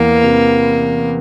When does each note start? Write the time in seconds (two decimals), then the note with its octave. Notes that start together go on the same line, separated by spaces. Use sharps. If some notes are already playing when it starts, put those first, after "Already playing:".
Already playing: E2 E3 A#3
0.23 C3